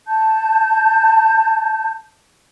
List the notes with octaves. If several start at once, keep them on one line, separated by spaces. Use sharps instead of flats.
A5 G6